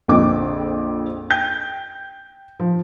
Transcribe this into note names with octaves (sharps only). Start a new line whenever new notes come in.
A#1 F2 D3 C4 D6
G5 G6
F3